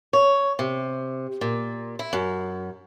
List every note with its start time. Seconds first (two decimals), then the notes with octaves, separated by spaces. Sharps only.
0.13 C#5
0.59 C3
1.41 A#2
1.99 E4
2.13 F#2